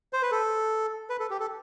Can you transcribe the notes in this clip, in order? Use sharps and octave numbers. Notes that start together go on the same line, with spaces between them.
C5
B4
A4
B4
A4
G4
A4